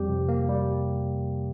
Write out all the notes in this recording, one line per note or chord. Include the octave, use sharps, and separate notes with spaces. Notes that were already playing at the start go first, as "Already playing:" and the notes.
Already playing: F2 G3 G4
C3
A#3
G3